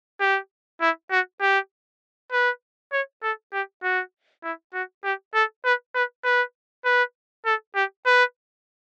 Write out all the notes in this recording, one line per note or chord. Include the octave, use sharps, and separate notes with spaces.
G4
E4
F#4
G4
B4
C#5
A4
G4
F#4
E4
F#4
G4
A4
B4
B4
B4
B4
A4
G4
B4